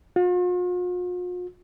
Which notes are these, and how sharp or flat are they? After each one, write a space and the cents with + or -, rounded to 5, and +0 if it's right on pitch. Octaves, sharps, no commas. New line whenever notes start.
F4 +45